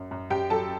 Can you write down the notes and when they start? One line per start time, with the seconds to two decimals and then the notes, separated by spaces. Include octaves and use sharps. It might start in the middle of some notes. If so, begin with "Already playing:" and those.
Already playing: F#2
0.11 F#2
0.30 F#2 G4 G5
0.50 F#3 A4 A5